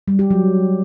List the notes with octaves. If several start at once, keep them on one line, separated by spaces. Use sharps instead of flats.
G3
G4
F#3